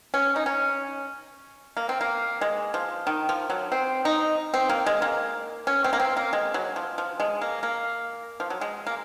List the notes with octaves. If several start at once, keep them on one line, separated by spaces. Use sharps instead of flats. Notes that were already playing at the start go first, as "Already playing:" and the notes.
C#4
D#4
C#4
A#3
C4
A#3
G#3
F3
D#3
F3
F#3
C4
D#4
C4
A#3
G#3
A#3
C#4
C4
A#3
C4
A#3
G#3
F#3
F3
F3
G#3
A#3
A#3
F3
F#3
G#3
A#3